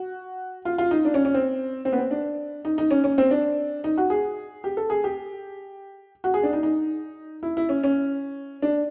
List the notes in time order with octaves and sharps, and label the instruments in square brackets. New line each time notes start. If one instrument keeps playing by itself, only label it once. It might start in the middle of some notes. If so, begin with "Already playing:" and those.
Already playing: [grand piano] F#4
F4
F4
D#4
D4
C#4
C#4
C4
C4
B3
C4
D4
D#4
D#4
C#4
C#4
C4
D4
D#4
F#4
G#4
G4
A4
G#4
G4
F#4
G#4
D4
D#4
D#4
E4
E4
C#4
C#4
D4